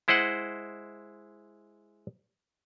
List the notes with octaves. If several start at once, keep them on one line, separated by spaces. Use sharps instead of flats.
G#3 E4 C5 D#5 F#5